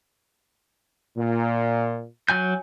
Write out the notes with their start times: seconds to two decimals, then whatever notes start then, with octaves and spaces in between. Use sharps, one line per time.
1.17 A#2
2.29 F#3 G#5 G6